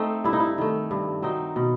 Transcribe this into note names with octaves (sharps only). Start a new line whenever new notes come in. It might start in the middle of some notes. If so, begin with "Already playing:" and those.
Already playing: A3 C4 D#4
G2 E4
D#4
E4
D#3 A3
G2
F#3 C4 D#4
B2